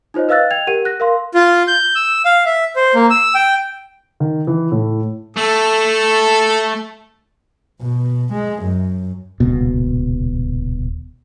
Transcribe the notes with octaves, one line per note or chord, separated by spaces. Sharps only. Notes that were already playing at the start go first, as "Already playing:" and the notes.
D#4 F4 C5 C#5 D#5
B4 D#5 F5 E6 F#6 A6
G5 G#6 F7
G4 A#4 F#5 D#7
F#6 A#6
A#4 F5 C6
F4
G6
E6
F5
E5
C5
A#3
E6
G5
D#3
E3
A2
A3 A4
B2
G#3
F#2
D#1 C#2 B2